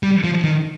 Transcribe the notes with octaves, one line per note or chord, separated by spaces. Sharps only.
G3
F3
D#3